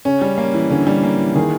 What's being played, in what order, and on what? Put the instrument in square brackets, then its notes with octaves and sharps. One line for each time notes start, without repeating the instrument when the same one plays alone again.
[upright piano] C#3 [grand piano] C#4
[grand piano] G3
A#3
E3
[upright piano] D3 [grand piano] C#4
[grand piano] G3
A#3
E3
[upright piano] D#3 [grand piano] G#4